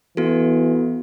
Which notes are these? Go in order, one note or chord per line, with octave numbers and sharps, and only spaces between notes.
E3 B3 F#4 A4